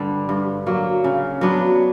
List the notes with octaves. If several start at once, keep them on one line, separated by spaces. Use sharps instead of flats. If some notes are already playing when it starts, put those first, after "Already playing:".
Already playing: G2 D3 G3
G2
F#3 A#3
C#3
F#3 B3 D4